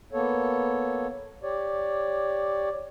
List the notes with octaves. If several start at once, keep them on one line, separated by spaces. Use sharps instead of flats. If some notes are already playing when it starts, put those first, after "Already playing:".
A#3 B3 A4 C#5
G4 C#5 D5